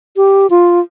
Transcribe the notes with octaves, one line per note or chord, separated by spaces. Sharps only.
G4
F4